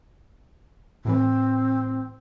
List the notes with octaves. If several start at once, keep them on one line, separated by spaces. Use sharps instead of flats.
A2 E3 C4